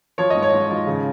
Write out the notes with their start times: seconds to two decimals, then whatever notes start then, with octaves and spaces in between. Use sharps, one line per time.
0.18 F3 C#5
0.30 G#2 D#5
0.42 C#5
0.53 G#2
0.70 F3
0.87 C#3